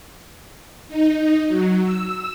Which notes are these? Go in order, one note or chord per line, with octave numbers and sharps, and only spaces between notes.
D#4
F#3
E6